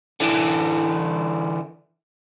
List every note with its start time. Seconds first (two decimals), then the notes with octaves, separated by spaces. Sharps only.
0.20 D3 E3